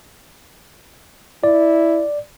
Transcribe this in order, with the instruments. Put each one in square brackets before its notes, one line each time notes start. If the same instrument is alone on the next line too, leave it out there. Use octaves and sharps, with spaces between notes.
[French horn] E4 [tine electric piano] D5